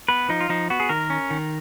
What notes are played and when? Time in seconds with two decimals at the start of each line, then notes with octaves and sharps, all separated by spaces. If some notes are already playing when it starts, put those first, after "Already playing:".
0.08 B3 B4
0.29 F3 D#4
0.40 F4
0.49 F3 D#4
0.70 B3 F#4
0.80 G#4
0.89 D#3 A#4
1.10 C#4
1.30 D#3